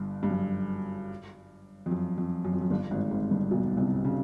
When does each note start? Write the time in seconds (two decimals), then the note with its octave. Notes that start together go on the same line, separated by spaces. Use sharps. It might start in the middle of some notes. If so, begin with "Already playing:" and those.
Already playing: G1 G2
0.23 G2
0.30 F#2
1.86 F2
1.91 F#2
2.18 F2
2.44 F#2
2.53 F2
2.61 F#2
2.70 G1 G2
2.91 G#1 G#2
3.10 G#1 G#2
3.31 G1 G2
3.51 B1 B2
3.77 C2 C3
4.05 C#3